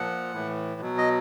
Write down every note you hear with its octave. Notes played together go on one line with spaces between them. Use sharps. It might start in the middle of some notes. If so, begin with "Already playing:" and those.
Already playing: A#2 F3 F#5
A2 E3
B2 F#3
D#5